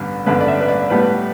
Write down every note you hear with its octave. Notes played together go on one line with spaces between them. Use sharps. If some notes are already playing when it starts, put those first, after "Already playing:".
Already playing: A1 G2 D3 B3
A1 G2 D3 B3 B4
D5
E5
B4
D5
A2 G3 B3 B4